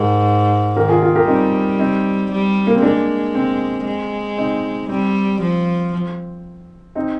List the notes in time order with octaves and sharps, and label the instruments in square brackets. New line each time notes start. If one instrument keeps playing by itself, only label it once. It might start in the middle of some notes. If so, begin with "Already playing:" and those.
Already playing: [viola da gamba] G#2 [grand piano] G4 A#4
[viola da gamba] D#3 [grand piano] G4 A#4
[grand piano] F4 G#4
F4 G#4
G4 A#4
[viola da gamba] G3 [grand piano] C4 D#4
[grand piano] C4 D#4
[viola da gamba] G3
[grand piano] A#3
C4
[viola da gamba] G#3 [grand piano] A#3 D4
[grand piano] C4
[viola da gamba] G#3
[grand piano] C4 D#4
[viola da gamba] G3 [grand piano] C4
[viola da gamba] F3
[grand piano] C4 D#4